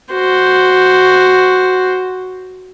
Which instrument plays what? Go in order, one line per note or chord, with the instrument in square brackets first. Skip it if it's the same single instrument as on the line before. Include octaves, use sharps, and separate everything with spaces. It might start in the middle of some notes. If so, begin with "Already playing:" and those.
[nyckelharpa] F#4 C5